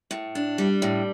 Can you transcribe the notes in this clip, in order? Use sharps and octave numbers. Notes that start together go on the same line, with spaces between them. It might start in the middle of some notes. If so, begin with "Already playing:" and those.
A2
D4
G3
A2